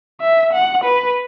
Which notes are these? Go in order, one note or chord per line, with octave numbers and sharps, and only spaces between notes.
E5
F#5
B4